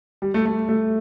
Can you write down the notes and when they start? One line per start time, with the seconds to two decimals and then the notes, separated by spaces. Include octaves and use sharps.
0.22 G3
0.34 A3
0.46 A3
0.69 A3